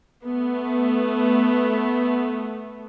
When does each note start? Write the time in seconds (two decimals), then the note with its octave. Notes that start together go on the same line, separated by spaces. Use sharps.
0.25 A3 B3